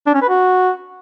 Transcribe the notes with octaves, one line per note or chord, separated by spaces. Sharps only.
D4
C#4
B4
F#4